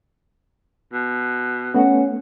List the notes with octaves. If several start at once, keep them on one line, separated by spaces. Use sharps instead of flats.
B2
A3 B3 C#4 F#5